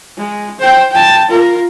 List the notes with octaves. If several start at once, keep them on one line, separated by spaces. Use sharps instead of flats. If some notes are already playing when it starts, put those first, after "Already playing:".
G#3
C5 G5
G5 A5
F4 A#4